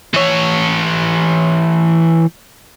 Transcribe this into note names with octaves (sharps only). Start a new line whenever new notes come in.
E3 C#5